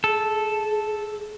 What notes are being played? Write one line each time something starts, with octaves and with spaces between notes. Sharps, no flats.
G#4 A4